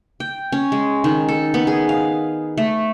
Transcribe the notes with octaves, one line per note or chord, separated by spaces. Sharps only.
G5
C#4
G#3
D#3
A4
B3
G#4
F5
A3